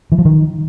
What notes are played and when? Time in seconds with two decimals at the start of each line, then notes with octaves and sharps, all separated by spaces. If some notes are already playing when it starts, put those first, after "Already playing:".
0.12 E3
0.18 F3
0.25 D#3